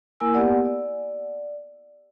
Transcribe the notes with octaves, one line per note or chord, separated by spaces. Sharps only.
A#3 E4 A#4 G#5 E6
B3 G4 D5 F#5
D5